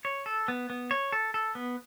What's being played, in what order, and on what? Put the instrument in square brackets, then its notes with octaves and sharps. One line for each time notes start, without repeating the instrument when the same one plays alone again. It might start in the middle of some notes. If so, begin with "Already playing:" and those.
[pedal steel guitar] C#5
A4
B3
B3
C#5
A4
A4
B3